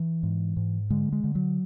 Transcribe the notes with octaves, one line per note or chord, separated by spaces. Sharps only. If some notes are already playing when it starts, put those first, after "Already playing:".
Already playing: E3
G#2
G#2
D3 G#3
G#3
D3
F#3